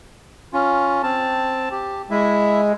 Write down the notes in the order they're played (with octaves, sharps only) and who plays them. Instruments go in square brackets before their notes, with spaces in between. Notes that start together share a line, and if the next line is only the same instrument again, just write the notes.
[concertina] C#4 F4
C4 A5
G4
[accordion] G#3 [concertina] E4 E5